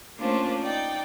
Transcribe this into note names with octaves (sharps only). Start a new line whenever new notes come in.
A3 A#3 C#4 D4 F4 C5
D#4 D5 G5